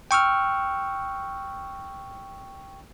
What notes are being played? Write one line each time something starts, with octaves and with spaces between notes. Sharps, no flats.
G5 C#6 E6 F6